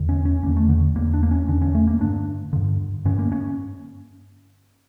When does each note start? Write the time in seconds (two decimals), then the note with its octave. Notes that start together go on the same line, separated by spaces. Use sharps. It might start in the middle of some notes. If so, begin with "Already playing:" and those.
Already playing: E2 D3
0.09 C#4
0.25 C#4
0.43 E2 D3 A#3
0.57 A3
0.69 D3
0.96 E2 D3 A#3
1.14 D4
1.23 A#3
1.31 C#4
1.47 E2 D3 D4
1.62 C#4
1.75 A3
1.87 A#3
2.00 G2 D3 D4
2.53 G2 D3
3.05 G2 D3 C#4
3.19 A#3
3.32 C#4